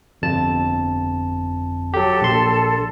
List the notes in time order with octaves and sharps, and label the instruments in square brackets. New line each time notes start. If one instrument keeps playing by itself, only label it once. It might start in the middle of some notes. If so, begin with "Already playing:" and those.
[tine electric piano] G1 F2 A5
[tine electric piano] F#3 G4 [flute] A4
[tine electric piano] A#1 C6